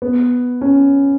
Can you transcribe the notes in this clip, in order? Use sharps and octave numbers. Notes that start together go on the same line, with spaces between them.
B3
C#4